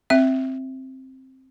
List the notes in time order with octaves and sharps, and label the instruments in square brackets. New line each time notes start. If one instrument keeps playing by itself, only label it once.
[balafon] C4 E5